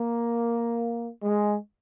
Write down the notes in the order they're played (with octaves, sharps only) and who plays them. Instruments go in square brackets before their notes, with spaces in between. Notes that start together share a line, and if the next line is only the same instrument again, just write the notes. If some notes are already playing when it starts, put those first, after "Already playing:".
Already playing: [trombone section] A#3
G#3